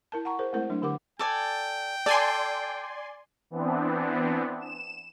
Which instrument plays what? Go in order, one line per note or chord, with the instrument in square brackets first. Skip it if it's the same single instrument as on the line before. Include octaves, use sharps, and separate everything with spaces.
[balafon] E4 A#4 A5
F#5 A#5 C#6
G#4 A#4 C5
G#3 A3 C4 E4 A#4 C5
F#3 A3 D4
D3 G4 A#4 F#5 D6
[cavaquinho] A4 D5 G#5 [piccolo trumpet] G5
[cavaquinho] A4 [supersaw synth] D5 G#5 C6
[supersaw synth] E3 B3 C4 D4
E7